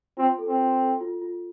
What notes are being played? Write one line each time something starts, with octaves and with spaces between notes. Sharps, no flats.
C4 F4
A4
C4
F4
A4
F4
F4